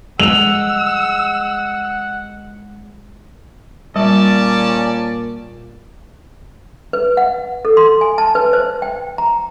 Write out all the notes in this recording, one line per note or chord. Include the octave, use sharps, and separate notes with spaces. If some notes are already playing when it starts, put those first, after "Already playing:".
G#3 F#5 E6 F7
A#2 G3 C#4 D5 A5
B4
F#5
A4
C6
G#5
A5
B4
C5
G5
A#5